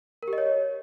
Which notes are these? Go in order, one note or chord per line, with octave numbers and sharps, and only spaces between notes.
A#4
G4
D#5
C#5